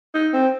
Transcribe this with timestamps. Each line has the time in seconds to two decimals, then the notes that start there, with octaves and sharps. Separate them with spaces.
0.15 D#4
0.34 C4